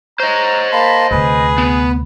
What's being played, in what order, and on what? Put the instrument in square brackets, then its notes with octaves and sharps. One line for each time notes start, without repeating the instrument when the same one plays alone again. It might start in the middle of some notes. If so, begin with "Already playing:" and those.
[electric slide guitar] C5 D#5 [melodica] C#5 [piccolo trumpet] A#5
[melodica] A#3 A5 C6 [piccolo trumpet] B5
[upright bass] D2 C3 [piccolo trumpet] G#4 [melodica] B4
[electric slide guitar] B3